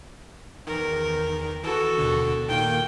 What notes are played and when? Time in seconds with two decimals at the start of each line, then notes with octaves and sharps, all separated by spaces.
0.67 E2 D#3 A#4
1.64 E3 F#4 A4
1.98 D#2 B2 D3
2.48 A#2 D#3 A#3 G5